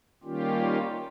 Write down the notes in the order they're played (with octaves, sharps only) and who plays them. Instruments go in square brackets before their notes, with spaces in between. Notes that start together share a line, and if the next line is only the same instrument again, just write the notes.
[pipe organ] D#3 G3 A#3 C#4 F4 G4